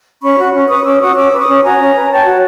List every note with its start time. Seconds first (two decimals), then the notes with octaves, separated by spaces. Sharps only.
0.22 C#4 B5 C#6
0.38 F#4
0.54 C#4
0.68 B4 C#6 D#6
0.84 C#4 D6 E6
1.00 F#4 C#6 D#6
1.16 C#4 D6 E6
1.33 B4
1.39 C#6 D#6
1.47 C#4
1.63 F#4 G#5 A#5
1.79 C#4
1.95 B4
2.11 C#5 G5 A5
2.26 F#4